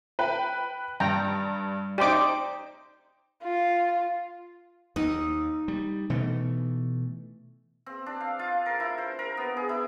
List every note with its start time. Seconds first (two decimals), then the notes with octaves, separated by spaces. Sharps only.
0.19 B4 G5
1.00 G2 G5 A#5
1.98 D#4 G4 C5 D5 D6
3.43 F4
4.96 D#2 D#4
5.68 G3
6.10 B2 E3 A3
7.86 C4
8.06 D4
8.21 F5
8.39 F4
8.66 A#4
8.80 E4
8.98 C5
9.19 A#4
9.37 B3
9.57 G#4
9.69 E4